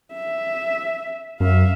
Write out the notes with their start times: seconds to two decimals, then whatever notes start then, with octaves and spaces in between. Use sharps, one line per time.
0.13 E5
1.40 F#2 E5 F5